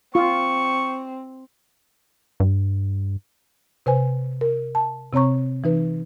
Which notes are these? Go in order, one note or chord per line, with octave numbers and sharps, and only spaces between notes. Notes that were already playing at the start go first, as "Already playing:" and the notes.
C4 F4 C#6
G2
C3 B4 C5 G#5
A#4
A5
C3 C4 C#5 A#5 C#6
E3 D#4 B4